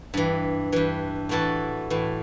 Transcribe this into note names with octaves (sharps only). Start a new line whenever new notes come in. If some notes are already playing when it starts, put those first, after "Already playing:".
G2 E3
G2 E3
A2 E3 F#4 A4
A2 E3